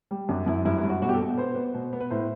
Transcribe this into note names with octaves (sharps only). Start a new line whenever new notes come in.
G3
F#2 D4
F#2 E4
G2 E4
E4
G2
F#4
B2 F#4
G4
A4
B2
B3 C5
B3
B2
B3
B4
A2 C5